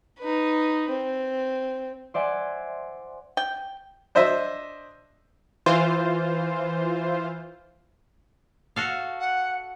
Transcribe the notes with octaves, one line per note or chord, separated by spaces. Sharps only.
D#4 B4
C4
C5 D5 E5 F#5 G#5
G5
D4 C5 D#5 E5
E3 F4 C5
F#4 A4 F5
F#5